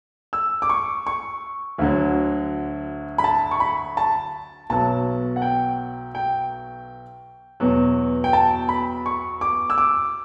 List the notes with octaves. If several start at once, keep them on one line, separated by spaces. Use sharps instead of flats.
E6
D6
C#6
C#6
D2 D3 F#3
B5
A5
C#6
B5
A5
B1 B2 F#3 A5
F#5
G5
G5
E2 B2 F#3
G5
A5
B5
C#6
D6
E6
D6